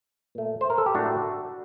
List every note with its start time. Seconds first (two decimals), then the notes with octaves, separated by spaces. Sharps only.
0.35 A#2 A3
0.61 C5
0.70 A#4
0.78 A4
0.86 G4
0.95 A2 A3 D4 F#4